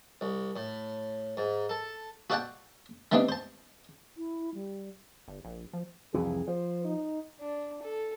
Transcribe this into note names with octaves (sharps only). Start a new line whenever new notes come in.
C2
A2
G#2
A4
F#4 A4 D5 F#5 G5 A5
G3 A3 B3 C4 D4 D#4
C5 A5
E4
G3
G1
A#1
F3
C2 F2 E3 G#4
F3 C5
D#4
D4
A4